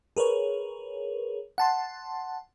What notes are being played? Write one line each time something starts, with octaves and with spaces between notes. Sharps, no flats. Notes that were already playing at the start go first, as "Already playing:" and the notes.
G#4 A#4 B4 C#5
F#5 A5 C6